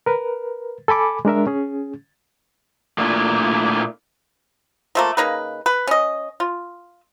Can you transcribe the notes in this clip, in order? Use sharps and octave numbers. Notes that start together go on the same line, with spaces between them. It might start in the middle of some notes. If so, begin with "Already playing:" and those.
A#4 B4
A4 G#5 B5 D6
G#3 D4 A#4 E5
C#4 G#4
A#2 A3 A#3 D4 E4 F4
F3 A3 A#3
C#3 A#3 D#4 B4
B4
C#4 D#5
F4